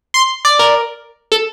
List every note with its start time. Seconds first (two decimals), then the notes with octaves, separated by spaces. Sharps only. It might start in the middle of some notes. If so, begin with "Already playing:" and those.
0.14 C6
0.45 D5
0.59 A#4
1.32 A4